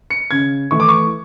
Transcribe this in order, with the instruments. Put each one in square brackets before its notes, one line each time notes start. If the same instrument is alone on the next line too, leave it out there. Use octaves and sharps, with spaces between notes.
[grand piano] C#7
C#3 G#6
E3 A3 C#6
D6
C#6